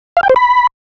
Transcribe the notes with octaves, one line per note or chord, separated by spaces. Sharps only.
F5
G5
C5
B5